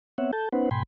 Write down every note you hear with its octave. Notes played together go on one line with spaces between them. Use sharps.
B3 C4 C#5 E5 F#5
A4 A5 G6
B3 C#4 D#4 B4 C5 F#5
G#2 B2 G5 G#5 B5 C6